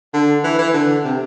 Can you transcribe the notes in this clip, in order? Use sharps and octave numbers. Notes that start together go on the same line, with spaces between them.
D3
E3
E3
D3
C3